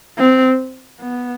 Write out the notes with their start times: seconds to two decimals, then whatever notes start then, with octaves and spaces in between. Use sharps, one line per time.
0.18 C4
1.00 B3